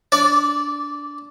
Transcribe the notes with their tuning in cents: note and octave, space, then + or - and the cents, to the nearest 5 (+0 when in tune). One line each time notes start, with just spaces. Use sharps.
D4 -15 D5 +0 D6 -40